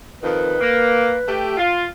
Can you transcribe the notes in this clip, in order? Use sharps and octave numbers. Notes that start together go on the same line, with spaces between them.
F2 D#3 B4
A#3
A3 G4
F4